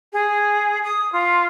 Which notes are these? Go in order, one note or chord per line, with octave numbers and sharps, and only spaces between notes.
G#4
D#6
F4